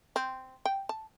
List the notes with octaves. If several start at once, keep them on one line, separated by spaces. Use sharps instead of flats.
C4
G5
A5